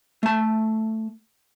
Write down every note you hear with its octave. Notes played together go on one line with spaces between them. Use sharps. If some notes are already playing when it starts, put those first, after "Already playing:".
A3 A5